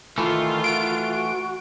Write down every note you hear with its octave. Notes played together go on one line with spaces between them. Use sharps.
D#3 E3 A3 F4
F#4 D7